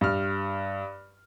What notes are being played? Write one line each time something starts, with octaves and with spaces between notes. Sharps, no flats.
G2 F6